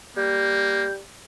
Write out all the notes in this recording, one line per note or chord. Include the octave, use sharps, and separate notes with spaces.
G3 A#3 G6